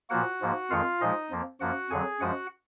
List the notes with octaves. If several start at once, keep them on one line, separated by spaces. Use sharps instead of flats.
A#2 F3 A#3 F#4 F#5
G#2 F3 A#3
F2 D#3 G#3 F4 F5
A#2 F3 G#3 D#4 D#5
F2 F3 A#3
F#2 F3 A#3 F#4 F#5
F2 D3 F#3 G#4 G#5
F#2 F3 G#3 F#4 F#5